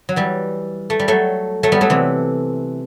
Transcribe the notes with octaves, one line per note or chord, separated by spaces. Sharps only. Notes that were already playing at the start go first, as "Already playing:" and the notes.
F#3
E3 G3
A3
G3
F#3 A3
F#3 A3
G3 B3
F#3 A3
C3 E3